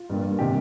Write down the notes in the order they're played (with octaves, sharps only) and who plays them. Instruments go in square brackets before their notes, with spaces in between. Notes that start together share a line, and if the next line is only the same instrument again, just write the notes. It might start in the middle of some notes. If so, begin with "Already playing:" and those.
Already playing: [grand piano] F4
G2 G3 A#3
C3 D#3 G3 G4